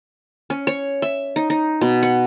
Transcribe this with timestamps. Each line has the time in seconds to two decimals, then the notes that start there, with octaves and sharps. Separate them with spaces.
0.50 C#4
0.67 C#5
1.02 E5
1.36 D#4
1.50 D#4
1.81 B2
2.03 F#5